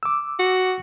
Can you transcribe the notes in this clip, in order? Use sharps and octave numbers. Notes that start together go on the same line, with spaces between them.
D6 E6
F#4